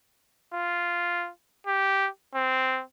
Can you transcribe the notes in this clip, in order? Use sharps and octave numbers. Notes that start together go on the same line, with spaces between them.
F4
G4
C4